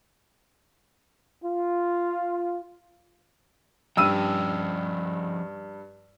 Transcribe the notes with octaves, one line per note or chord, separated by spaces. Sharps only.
F4
G2 F3 C#4 G5 E6 D#7